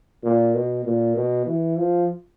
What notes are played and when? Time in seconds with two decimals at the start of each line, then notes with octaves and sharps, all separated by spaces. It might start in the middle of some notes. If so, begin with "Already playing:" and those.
0.23 A#2
0.54 B2
0.85 A#2
1.16 B2
1.46 E3
1.78 F3